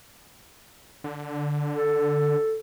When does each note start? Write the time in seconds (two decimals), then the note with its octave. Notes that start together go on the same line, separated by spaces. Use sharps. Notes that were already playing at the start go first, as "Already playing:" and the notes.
1.04 D3
1.72 A4